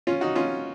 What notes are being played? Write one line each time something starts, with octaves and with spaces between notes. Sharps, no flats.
C#4 F4
D#4 F#4
C#4 F4